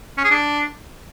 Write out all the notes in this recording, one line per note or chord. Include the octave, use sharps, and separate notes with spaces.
C#4
G#4
D4